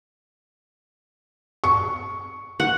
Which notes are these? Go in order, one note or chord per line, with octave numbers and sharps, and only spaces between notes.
C#6
F#5